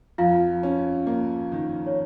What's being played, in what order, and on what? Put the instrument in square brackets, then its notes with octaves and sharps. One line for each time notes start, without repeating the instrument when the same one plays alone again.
[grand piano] F2 [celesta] F4 F5
[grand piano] C#4
A#3
D#3
[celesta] C#5